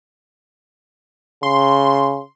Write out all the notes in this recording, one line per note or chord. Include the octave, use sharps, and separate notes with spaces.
C#3 C6